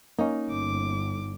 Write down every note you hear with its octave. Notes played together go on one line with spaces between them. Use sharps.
A#3 C#4 D#4
G1 D6